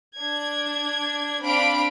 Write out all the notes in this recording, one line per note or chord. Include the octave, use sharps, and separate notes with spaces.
D4 G#6
C4 D4 F5 B5 D7